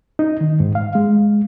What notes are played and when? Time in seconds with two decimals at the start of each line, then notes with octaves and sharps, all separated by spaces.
0.19 D#4
0.41 D#3
0.60 G#2
0.75 F5
0.95 G#3